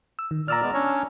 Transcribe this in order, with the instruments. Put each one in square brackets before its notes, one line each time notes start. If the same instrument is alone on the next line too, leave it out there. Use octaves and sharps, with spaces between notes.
[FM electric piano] E6
D#3
[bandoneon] A#2 D5 [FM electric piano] A#5 E6 F6
[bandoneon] G#3 B3 D5
C#4 D4 C#5